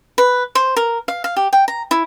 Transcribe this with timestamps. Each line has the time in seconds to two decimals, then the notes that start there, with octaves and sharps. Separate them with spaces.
0.18 B4
0.55 C5
0.76 A#4
1.08 F5
1.24 F5
1.36 G4
1.53 G5
1.68 A#5
1.91 E4